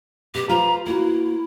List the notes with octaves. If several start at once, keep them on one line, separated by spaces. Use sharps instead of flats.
B2 G4
F4 B4 C5 A#5
A#3 E4 F#4